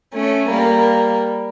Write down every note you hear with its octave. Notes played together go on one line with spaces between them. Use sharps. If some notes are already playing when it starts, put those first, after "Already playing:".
A3 C#4
G3 A#3